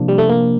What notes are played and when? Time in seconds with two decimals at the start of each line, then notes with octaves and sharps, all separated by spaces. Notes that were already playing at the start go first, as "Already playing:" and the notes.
Already playing: C3 F3 A#3 D4
0.08 G3
0.18 A3
0.29 A#3